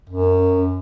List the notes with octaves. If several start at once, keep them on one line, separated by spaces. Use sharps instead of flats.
F#2